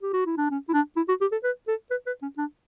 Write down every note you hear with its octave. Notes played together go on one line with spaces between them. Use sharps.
G4
F#4
E4
D4
C#4
E4
D4
E4
F#4
G4
A4
B4
A4
B4
B4
C#4
D4